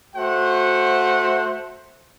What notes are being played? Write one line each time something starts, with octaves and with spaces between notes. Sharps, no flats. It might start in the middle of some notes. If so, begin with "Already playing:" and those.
A3 F#4 C5 F#5